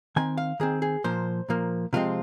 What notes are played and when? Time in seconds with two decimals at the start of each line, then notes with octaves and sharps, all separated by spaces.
0.16 D#3 C4 G#5
0.37 F5
0.60 D#3 C4 G#4
0.82 G#4
1.04 A#2 F3 A#3 C5
1.49 A#2 F3 A#3
1.93 C3 F3 G#3 C4 F4